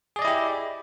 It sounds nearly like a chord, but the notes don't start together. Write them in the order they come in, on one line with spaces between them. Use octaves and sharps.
G#4 D5 D#5 E4 G4